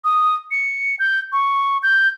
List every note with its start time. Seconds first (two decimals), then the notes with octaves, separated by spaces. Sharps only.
0.04 D#6
0.51 C#7
0.99 G6
1.32 C#6
1.83 G6